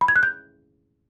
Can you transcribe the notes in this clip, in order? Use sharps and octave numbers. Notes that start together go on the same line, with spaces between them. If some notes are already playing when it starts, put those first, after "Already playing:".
B5
G#6
F#6
G6